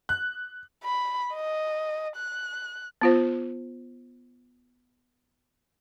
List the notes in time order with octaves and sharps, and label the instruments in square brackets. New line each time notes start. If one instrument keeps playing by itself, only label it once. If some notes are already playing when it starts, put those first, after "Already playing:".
[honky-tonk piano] F#6
[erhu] B5
D#5
F#6
[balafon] B3 F4 C5